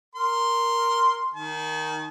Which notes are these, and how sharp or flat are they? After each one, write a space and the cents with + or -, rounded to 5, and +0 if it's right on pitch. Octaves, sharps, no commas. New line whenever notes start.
A#4 +0 C6 +0
D#3 +0 A5 -45